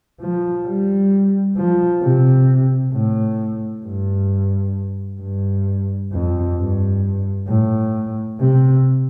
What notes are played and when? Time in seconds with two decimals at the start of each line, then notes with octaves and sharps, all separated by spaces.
0.20 F3
0.66 G3
1.57 F3
2.02 C3
2.92 A2
3.84 G2
5.20 G2
6.12 F2
6.57 G2
7.48 A2
8.40 C3